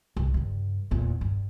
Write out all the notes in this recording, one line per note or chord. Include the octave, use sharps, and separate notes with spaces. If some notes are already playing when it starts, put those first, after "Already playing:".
C2 A2
G2 C#3
E2 A#2
G2